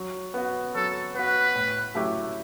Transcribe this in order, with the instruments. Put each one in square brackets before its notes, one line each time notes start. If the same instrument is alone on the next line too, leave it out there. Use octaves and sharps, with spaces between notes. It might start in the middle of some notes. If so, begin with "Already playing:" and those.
Already playing: [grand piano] F#3
B3 F#4
[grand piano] F#3 [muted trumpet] A4
[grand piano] B3 F#4 [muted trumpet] B4
[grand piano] A2
F#3 A3 E4 G4